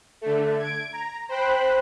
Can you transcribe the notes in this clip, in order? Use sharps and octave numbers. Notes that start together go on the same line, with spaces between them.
D3 A3
G#6 D7
A#5
C5 G5 B5 F#6